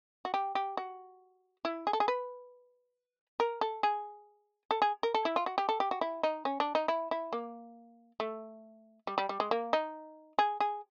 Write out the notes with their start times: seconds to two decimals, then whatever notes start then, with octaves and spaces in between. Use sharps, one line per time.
0.25 F#4
0.34 G4
0.55 G4
0.77 F#4
1.65 E4
1.87 G#4
1.93 A4
2.00 G#4
2.08 B4
3.40 A#4
3.61 A4
3.83 G#4
4.71 A4
4.82 G#4
5.03 A#4
5.14 A4
5.25 E4
5.36 F4
5.46 F#4
5.58 G4
5.69 A4
5.80 G4
5.91 F#4
6.01 E4
6.23 D#4
6.45 C#4
6.60 D4
6.75 D#4
6.88 E4
7.11 E4
7.33 A#3
8.20 A3
9.07 G3
9.18 G3
9.29 G3
9.40 G#3
9.51 A#3
9.73 D#4
10.39 G#4
10.60 G#4